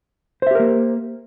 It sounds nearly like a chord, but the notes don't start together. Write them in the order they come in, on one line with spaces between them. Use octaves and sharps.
C5 E5 G4 A#4 A#3